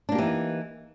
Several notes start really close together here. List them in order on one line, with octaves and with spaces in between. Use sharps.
D4 A#3 G4 E3 D#4